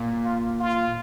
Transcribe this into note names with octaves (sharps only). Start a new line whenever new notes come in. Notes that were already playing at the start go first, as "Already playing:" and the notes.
Already playing: A#2
F4
F4